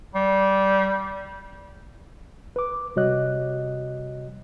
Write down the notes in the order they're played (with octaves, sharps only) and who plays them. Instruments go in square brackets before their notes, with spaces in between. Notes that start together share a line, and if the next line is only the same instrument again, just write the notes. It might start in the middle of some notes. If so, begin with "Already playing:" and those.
[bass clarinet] G3
[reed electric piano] B4 D6
C3 G3 F#4 C#5 D#5 F#6